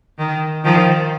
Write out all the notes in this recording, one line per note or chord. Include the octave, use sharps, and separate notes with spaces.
D#3
D#3 F3